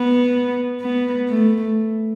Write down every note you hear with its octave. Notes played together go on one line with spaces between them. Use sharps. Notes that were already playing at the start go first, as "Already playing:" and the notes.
Already playing: B3
B3
A3